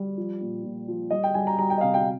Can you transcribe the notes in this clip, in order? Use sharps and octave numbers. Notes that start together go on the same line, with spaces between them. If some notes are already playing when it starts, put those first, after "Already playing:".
Already playing: G3
F3
A#2
A#2
F3
G3 D#5
G5
G3 G#5
A#5
G3 A#5
G5
D#5
C3 F5
G5